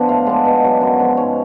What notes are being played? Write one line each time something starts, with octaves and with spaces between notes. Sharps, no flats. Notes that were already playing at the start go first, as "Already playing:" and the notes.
Already playing: F3 B3 D4 D5
A2 F5
G#3 B3 D4
B2
F#3 B3
F#2
F3 G#3 C#4
G#2 C#5